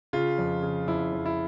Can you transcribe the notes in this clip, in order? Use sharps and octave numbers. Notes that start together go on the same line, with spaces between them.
C#3 F4
F2
C#3
F2 E4
F2
E4